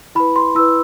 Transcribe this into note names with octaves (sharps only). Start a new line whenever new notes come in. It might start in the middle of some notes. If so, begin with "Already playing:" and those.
E4 B4 B5
C6
E4 B4 E6